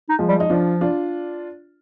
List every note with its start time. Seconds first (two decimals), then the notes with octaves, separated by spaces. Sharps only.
0.09 D#4
0.19 F3 G#3
0.28 G3
0.40 D#4
0.50 F3 D4 F4
0.81 D4 F4